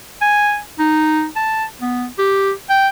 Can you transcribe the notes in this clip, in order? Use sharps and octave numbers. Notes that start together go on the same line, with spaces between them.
G#5
D#4
A5
B3
G4
G5